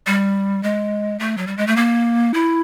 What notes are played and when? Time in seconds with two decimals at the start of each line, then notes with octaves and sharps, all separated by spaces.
0.07 G3
0.63 G#3
1.19 A3
1.37 F#3
1.47 G3
1.57 G#3
1.67 A3
1.76 A#3
2.34 E4